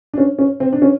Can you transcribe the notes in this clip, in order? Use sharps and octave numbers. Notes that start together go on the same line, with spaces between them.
D4
C#4
C#4
C4
D4
C#4